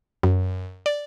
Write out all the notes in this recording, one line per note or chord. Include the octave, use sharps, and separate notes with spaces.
F#2
D5